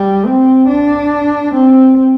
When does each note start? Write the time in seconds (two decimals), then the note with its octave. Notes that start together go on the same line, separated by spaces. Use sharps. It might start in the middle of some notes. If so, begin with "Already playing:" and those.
Already playing: G3
0.25 C4
0.68 D4
1.54 C4